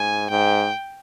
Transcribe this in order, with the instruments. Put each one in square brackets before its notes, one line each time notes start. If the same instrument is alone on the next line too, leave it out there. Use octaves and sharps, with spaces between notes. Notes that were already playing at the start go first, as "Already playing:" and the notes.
Already playing: [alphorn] G#2 [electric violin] G#5
[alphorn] G#2 [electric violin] G5